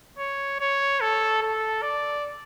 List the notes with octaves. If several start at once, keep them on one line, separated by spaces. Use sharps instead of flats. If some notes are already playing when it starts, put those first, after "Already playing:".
C#5
C#5
A4
A4
D5